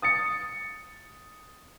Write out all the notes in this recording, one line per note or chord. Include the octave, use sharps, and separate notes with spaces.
D#6 A6 C#7